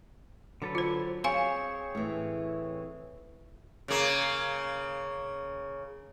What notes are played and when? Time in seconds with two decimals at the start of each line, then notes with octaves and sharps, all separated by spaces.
0.62 D3 F#3 A4 B4
0.75 F4 C5
1.24 C4 G#4 C#5 F5 G#5 C6
1.95 A2 E3
3.88 C#3 A#3